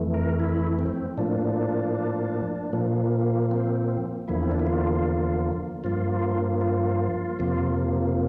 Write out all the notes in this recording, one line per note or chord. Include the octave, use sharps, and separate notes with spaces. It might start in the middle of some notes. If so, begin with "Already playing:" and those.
Already playing: F2 E3 A3
A#4
E4
C4
A2 F3 A#3 D4
A#2 F3 A#3
C4
E2 D3 F3 A#3 E4
C4
D4
E4
F4
G2 F3 A#3 F4
F4
F2 C3 F3 A#3